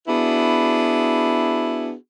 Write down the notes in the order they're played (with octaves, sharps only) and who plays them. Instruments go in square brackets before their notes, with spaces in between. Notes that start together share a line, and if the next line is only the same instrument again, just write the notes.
[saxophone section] B3 D4 E4 F#4 G#4